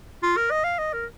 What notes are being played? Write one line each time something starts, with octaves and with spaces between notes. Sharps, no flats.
F4
A#4
D#5
F5
D#5
A#4